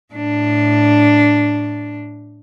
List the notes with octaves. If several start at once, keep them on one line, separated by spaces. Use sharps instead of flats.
A2 D4